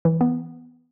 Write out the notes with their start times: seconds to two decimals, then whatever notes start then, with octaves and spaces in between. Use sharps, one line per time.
0.05 E3
0.21 B3